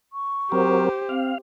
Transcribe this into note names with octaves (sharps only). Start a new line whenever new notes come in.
C#6
F#3 C4 G4 A#4 C5
C4 F5